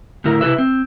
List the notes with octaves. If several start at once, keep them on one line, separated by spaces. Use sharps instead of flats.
A2 D3 E4 A#4
C3 E4 A4 B4 E5
C4